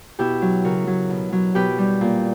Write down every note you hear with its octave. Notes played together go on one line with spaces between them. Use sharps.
B2 E4 G4
F#3
C#3 F#4 A#4
F#3
B2
F#3
B2 G4 B4
G3
A#2